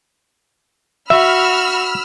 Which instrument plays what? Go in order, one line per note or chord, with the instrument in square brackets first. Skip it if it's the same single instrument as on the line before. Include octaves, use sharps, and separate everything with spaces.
[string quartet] F#4 [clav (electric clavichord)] E5 [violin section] B5 E6 F6